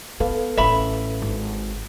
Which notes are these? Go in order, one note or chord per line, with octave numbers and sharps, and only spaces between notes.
B3 A4 B4 F5
A1 C#4 E5 B5
G#1